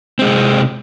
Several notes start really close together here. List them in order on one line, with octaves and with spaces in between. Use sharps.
C4 G#3 C3